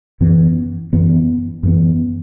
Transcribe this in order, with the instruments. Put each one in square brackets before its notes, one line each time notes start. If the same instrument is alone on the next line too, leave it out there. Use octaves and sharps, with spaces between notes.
[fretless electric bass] F#2 E3 B3
F#2 E3 B3
F#2 E3 B3